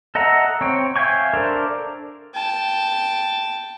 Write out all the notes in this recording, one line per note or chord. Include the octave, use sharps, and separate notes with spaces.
A4 D#5 E5 F#5 A#5
C4 C#5 G5
E5 F5 G5 G#5 C#6
D4 A4 A#4 C5 D5
G5 A5